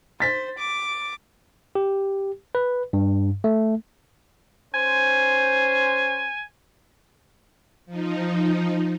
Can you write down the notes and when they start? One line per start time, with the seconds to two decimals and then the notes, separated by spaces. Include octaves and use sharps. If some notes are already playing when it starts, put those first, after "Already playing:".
0.20 C5 A6 B6
0.58 D6
1.75 G4
2.55 B4
2.93 G2
3.44 A3
4.74 C#4 C5 G#5
7.86 F3 D#4